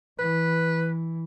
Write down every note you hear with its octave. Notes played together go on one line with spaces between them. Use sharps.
E3 B4